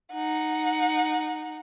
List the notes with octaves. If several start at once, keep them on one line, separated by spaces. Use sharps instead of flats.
D#4 F#5